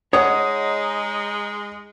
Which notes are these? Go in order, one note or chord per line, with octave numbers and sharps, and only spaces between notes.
G#3 D#4 C#5 F#5 D#6